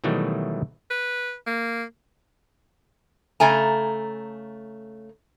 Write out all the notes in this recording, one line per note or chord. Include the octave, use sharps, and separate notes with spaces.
B2 D#3 E3 F#3 G3 A3
B4
A#3
C#3 A3 G#5 A#5